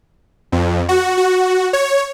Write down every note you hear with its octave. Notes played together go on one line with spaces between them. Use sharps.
F2
F#4
F#4
C#5